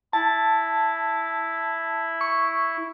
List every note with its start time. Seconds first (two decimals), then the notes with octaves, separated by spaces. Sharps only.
0.13 E4 A5
2.21 C#6